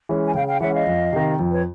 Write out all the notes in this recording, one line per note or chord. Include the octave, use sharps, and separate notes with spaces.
E3 G#3 C#4
G#5
C#3 F5 G5
F5 G5
E3 G#3 C#4 E5 F#5
D#5 F5
F2
C3 D#3
F2
B4 C#5